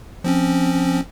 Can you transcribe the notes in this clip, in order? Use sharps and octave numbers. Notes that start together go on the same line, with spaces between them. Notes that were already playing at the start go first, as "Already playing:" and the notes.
F3 C4 C#4